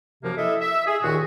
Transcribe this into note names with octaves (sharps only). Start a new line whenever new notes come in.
F#2 C3 F3 A#3
E4 A4 D#5 E5
E5
G#4
D#2 A#2 D#3 F#4